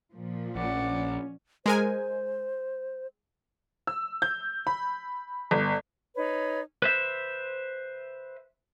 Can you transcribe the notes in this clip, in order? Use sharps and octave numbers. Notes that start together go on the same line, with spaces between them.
A#2 F3
A#1 C#4 D5 F#5
G#3 A#4 C5 G#5
E6
G6
B5
G1
D#4 B4 C#5
B4 C5 E5